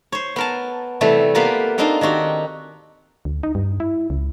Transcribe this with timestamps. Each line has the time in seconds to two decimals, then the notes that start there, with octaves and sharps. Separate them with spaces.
0.12 C5 C#5
0.36 B3 A#4 A5
1.01 C3 E3 G3 A3
1.35 A#3 B3 F4 G4 A#4 B4
1.78 A#3 C4 D4 D#4 F4 A#4
2.01 D#3 C4 F#4 G4
3.25 D2
3.43 D#4
3.55 G2
3.80 E4
4.10 C#2